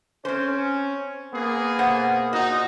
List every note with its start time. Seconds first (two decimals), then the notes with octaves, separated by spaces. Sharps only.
0.25 C4 C#4 C5
1.34 A#3 B3 G#4
1.79 B2 C5 F#5
2.33 A#2 D#4 F#4